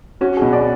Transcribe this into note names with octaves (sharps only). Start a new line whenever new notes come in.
C#4 F#4
B2 G#4
D5